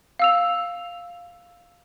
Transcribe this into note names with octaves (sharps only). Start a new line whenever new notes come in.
F5 E6 F7